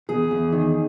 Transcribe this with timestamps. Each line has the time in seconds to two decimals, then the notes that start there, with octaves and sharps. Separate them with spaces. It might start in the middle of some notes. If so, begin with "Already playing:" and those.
0.09 E2 G#4
0.31 E2
0.52 D#3